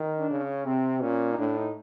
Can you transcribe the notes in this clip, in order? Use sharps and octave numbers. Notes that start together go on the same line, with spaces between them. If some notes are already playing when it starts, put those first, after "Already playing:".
Already playing: D#3
D4
C#3
C#4
C3 C4
A#2 C#4
D#4
A2 D4
D#4